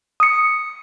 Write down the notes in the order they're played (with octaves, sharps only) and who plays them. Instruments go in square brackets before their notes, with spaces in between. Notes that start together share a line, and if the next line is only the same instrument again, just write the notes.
[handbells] D#6 C#7